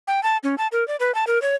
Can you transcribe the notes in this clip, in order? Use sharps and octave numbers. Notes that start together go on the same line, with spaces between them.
G5
A5
C#4
A5
A#4
D5
B4
A5
A#4
C#5